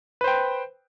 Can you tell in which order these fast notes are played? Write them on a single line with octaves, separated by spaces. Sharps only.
B4 C5 G5